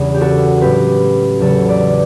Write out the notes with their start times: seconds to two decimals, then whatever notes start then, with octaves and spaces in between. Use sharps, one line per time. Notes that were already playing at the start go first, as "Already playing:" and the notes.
Already playing: E2 C#3 G3
0.14 G4
0.21 F#4 A4
0.61 A2 F#3 C#4 G4 B4
1.40 E2 C#3 F#3 A4 C#5
1.68 B4 D5